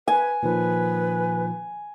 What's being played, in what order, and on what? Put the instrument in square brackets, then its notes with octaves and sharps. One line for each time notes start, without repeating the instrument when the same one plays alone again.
[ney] B4 [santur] G#5
[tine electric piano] A#2 D#3 F3 [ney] B4